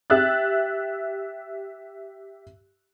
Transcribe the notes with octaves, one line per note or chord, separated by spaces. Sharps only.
G4 E5 E6 F#6 A6